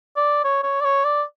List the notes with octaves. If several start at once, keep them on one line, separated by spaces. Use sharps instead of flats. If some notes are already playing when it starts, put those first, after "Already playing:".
D5
C#5
C#5
D5
C#5
D5